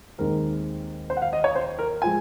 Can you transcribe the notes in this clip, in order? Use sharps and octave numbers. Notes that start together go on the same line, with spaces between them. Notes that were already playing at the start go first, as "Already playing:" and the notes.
D#2 D#3 G#3 C4 A#4
C5
F#5
F5
D#5
C#5
C5
A#4
F3 G#3 G#5